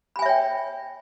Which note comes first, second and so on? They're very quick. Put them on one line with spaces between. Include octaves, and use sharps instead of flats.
B5 G#5 E5 C#5 G5